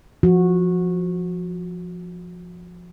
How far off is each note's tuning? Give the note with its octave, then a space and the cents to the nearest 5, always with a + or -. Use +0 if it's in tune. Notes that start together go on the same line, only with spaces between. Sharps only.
F3 +0 F#4 -15